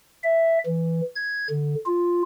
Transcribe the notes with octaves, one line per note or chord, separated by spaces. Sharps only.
E5
E3
G#6
D3
F4